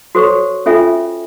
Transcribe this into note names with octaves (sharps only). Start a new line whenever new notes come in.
F#4 A4 C5 C#5 C#6
C#4 F4 A4 E5 G#5